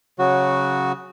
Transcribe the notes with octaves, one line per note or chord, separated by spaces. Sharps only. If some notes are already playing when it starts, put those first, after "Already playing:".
C#3 F#3 F#4